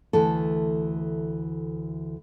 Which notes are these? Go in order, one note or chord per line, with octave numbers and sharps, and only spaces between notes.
D2 E3 A4